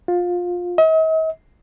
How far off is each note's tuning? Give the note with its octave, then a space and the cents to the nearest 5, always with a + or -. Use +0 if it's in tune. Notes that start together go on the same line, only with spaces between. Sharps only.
F4 +20
D#5 +45